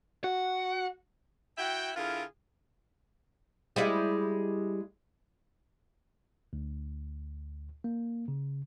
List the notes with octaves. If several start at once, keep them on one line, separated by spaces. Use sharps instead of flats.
F#4 F#5
E4 F#4 E5 F#5 G5
D3 E4 F4 G#4 A#4
G3 G#3 E4
D2
A#3
C#3